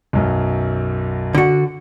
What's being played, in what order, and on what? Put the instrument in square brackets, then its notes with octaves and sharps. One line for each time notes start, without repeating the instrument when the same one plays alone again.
[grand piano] B1 F#2
[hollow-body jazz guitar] D3 F#4